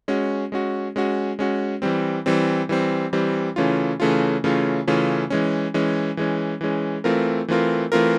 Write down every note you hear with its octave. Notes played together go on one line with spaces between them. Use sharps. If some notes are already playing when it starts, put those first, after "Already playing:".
G#3 C#4 F#4
G#3 C#4 F#4
G#3 C#4 F#4
G#3 C#4 F#4
E3 G3 C4
E3 G3 C4
E3 G3 C4
E3 G3 C4
C#3 E3 A3 C#4 F4
C#3 E3 A3 C#4 F4
C#3 E3 A3 C#4 F4
C#3 E3 A3 C#4 F4
E3 G#3 C#4
E3 G#3 C#4
E3 G#3 C#4
E3 G#3 C#4
E3 A3 C4 F4 A#4
E3 A3 C4 F4 A#4
E3 A3 C4 F4 A#4